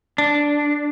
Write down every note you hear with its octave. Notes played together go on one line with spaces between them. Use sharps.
D4